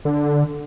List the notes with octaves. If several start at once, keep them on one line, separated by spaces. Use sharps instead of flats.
D3